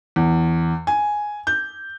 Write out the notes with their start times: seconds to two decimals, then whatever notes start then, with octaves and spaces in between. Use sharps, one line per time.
0.16 E2
0.87 G#5
1.47 G6